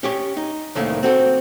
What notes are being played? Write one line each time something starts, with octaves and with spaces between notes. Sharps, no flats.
C#4 G4 C#5
D#4
C2 A2 D#3 A3 A#3 C#4
C4 F#4 A4